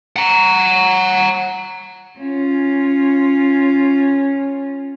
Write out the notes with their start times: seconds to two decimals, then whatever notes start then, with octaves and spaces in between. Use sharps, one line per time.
0.16 F#5 A#5
2.19 C#4 F4